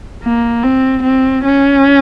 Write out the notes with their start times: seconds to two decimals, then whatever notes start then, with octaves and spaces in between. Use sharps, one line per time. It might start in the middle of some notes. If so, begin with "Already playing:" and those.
0.23 A#3
0.63 C4
1.03 C4
1.44 C#4